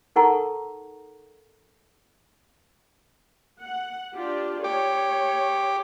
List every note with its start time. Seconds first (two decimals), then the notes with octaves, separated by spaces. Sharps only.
0.16 D#4 A4 A#4 F#5 A#5 C#6
3.60 F#5
4.14 D4 F4 G4
4.64 G4 C#5